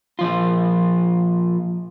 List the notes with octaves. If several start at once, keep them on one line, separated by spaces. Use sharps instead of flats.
A#2 F3 F4